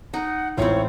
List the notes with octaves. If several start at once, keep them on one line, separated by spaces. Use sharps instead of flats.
D#4 F#5
A1 G#2 C4 E4 F4 C#5